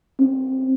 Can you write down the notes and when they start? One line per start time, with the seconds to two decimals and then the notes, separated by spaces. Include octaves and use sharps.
0.20 C4